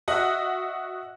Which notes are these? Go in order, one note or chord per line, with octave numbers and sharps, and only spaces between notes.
F#4 D#5 E5 F#5